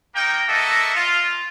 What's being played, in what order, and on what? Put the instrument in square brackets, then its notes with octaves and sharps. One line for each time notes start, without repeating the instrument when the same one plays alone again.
[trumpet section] A#3 D#4 A#4 G5
A#3 F#4 A4 D#5 E5
F4